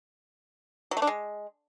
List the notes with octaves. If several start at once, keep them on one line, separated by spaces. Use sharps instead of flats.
F#3
A3
D4
G#3